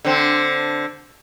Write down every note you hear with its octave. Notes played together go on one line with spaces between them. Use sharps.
D3 C4